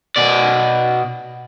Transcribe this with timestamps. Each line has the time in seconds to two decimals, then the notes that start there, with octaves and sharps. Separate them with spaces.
0.16 B2 D5